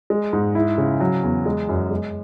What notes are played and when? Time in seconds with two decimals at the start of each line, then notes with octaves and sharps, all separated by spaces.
0.10 G#3
0.33 G#2
0.55 E4
0.78 C#3
1.00 F#3
1.23 E2
1.46 G#3
1.69 F#2
1.91 G#3